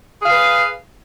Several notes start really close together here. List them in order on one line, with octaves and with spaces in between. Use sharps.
G#4 F5 B4